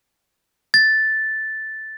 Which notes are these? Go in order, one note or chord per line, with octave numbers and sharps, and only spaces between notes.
A6